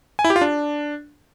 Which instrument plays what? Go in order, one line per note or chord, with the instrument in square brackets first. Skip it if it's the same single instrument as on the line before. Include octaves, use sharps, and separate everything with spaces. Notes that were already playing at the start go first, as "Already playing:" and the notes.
[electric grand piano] G#5
E4
G4
F4
D4